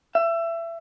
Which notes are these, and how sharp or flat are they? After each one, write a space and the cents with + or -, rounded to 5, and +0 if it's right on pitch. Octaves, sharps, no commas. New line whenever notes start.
E5 +25